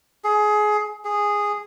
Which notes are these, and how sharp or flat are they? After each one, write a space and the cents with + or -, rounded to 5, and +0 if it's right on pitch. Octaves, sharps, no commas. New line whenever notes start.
G#4 +20
G#4 -10